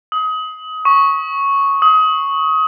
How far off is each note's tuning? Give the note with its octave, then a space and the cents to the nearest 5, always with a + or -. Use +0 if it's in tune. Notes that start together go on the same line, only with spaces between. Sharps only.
D#6 +25
C#6 -5
D#6 +25